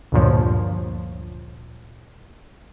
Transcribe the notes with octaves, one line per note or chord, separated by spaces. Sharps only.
D2 G2 A#2 F3 C#5